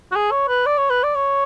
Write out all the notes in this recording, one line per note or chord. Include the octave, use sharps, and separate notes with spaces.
F#4
G#4
C#5
B4
D5
C#5
B4
D5
C#5